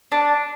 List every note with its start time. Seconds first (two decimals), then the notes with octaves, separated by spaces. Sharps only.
0.12 D4